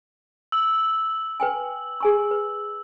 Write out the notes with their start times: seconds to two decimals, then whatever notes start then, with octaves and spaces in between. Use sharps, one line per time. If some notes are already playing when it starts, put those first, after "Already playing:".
0.52 E6 F#7
1.40 B4 G5 G#5
2.00 G#4 G#5 C#6
2.31 B4